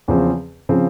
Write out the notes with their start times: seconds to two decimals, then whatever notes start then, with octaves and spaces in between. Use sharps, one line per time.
0.08 E2 C#3 F3 C4
0.69 C#3 F3 C4